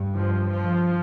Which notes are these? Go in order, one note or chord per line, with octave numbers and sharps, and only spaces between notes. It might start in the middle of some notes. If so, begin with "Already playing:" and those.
Already playing: G2
F3
F3